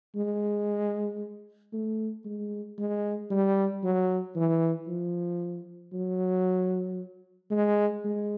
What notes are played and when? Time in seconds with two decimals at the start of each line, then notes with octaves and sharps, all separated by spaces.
0.15 G#3
1.73 A3
2.25 G#3
2.78 G#3
3.30 G3
3.83 F#3
4.36 E3
4.88 F3
5.93 F#3
7.51 G#3
8.04 G#3